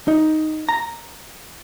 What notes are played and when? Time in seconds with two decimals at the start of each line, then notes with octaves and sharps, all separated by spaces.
0.08 D#4
0.69 A#5